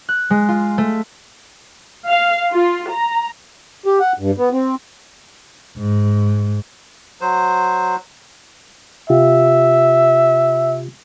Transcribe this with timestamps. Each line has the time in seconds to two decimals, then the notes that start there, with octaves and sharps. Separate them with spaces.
0.09 F#6
0.30 G#3
0.49 F4
0.78 A3
2.08 F5
2.52 F4
2.90 A#5
3.86 G4
4.00 F#5
4.19 G2
4.38 B3
4.53 C4
5.78 G#2
7.21 F#3 C5
9.10 C3 F4 G4 E5